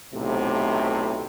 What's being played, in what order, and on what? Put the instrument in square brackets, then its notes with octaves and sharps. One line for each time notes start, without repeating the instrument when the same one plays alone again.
[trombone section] B1 A2 C3